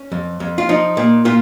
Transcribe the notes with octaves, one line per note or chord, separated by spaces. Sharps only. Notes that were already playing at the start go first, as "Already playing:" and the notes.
Already playing: C#4
F2
F2
F4
F3 D#4
A#2
A#2 F4